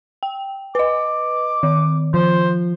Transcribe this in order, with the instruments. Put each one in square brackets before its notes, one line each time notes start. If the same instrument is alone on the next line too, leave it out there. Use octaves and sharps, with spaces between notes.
[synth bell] G5
[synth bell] B4 D#5 [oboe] D6
[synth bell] D#3
[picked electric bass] F3 [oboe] C5